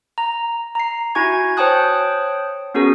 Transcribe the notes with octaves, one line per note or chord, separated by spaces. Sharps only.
A#5
A#5 C7
E4 F#4 G#5 C#6 G#6
C5 C#5 G5 A5 D#6 F#6
B3 C#4 F#4 G#4 A#4